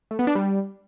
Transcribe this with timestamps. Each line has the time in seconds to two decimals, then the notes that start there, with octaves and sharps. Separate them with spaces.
0.11 A3
0.19 B3
0.27 D4
0.35 G3